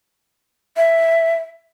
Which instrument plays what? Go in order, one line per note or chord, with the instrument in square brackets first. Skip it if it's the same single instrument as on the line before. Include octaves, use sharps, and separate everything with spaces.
[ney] E5